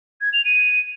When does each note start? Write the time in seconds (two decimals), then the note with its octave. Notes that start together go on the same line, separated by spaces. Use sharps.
0.21 G#6
0.33 F7
0.45 D#7